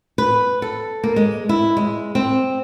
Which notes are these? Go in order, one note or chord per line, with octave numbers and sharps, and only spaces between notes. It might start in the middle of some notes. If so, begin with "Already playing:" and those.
B4
A4
A#3
G#3
E4
G#3
C4